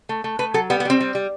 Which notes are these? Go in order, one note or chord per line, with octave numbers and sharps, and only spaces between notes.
A3
A3
A3 B4
F#3 A4
G3 B3
B3
G3 C4
G3
G3